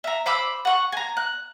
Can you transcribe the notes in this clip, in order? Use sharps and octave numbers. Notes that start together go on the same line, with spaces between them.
E5 A#5
C5 B5 D6 E6
F#5 C#6
G#5 A#5
F#6